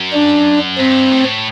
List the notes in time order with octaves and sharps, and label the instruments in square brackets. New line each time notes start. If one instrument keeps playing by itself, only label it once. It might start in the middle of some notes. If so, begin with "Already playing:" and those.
Already playing: [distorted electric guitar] F#2
[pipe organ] D4
[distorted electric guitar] G2 [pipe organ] C4
[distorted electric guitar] A2